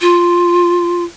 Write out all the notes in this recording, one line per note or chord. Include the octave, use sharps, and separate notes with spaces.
F4